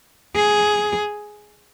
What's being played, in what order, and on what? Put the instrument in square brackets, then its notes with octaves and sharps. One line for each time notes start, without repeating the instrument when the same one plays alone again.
[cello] G#4